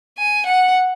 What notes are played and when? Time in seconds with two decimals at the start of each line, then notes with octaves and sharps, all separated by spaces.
0.18 G#5
0.46 F#5